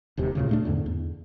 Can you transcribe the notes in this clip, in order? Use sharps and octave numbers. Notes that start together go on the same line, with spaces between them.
E1 D#2 C3 D#3
D2 A#2 C#3
A#2 A3 D4
E2 G#2 D3
E2